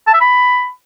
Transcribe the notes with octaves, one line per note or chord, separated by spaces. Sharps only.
A5
E5
B5